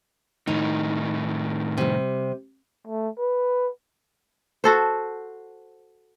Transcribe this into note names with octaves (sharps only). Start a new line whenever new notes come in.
A2 D#3 D#4
C3 G3
A3
B4
F#4 A4 C5